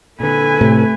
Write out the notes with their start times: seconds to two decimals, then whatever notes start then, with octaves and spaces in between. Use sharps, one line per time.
0.20 A#2 D3 A4 B4 G#5
0.61 A2 C3 A3